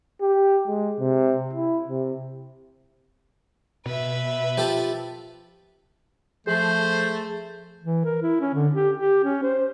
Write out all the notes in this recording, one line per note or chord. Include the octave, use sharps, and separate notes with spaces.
G4
G#3
C3
E4
C3
B2 B4 E5
F3 G4 A4
F3 A3 G#4 C5
E3
A#4
E4
C#4
D3
G4
G4
C#4
C5